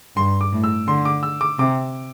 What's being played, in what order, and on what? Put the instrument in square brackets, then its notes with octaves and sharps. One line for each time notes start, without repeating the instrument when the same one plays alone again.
[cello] G2 [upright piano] C6
[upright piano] D6
[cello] A2
[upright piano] E6
[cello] D3 [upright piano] C6
[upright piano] D6
E6
D6
[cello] C3 [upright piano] D6